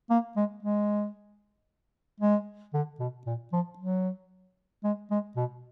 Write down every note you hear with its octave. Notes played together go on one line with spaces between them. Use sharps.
A#3
G#3
G#3
G#3
D3
B2
A#2
F3
F#3
G#3
G#3
B2